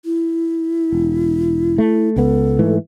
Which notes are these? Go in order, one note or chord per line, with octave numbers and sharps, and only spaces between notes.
E4
E1
A3
C#2 B3 A4
G#2 E3 A3